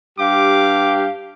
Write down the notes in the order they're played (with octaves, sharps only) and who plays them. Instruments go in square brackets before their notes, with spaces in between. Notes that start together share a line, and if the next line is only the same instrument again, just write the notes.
[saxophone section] G2 G4 F5 [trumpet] D6